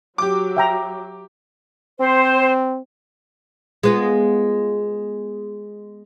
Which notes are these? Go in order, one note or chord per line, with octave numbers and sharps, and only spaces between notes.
F#3 G4 D6
E5 G5 A#5
C4 C5
G#3 B3 F4